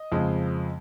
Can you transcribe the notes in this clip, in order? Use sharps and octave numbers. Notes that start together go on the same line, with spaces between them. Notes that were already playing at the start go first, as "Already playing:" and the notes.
Already playing: D#5
F2 C#3 F3 G#3